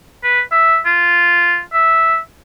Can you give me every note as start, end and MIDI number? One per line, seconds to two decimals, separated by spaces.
0.23 0.40 71
0.52 0.78 76
0.85 1.61 65
1.73 2.18 76